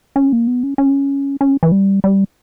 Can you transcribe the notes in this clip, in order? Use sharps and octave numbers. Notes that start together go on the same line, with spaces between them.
C#4
A#3
B3
C#4
C#4
C#4
E3
G3
G3